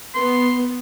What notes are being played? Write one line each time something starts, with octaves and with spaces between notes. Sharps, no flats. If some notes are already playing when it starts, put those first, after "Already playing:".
B3 C6